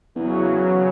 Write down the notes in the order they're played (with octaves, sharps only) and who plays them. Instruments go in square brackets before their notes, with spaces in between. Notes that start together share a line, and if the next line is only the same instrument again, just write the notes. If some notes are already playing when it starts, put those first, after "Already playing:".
[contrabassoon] E2 [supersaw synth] C#3 F#3